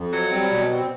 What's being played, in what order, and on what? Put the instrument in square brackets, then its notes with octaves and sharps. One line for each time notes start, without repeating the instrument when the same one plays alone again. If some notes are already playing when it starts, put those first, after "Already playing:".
Already playing: [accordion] F2
[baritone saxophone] F#3 [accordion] C4
[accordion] G3
B2
C4